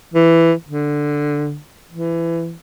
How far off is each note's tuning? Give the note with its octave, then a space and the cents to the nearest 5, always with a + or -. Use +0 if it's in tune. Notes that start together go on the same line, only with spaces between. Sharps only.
E3 +10
D3 +5
E3 +20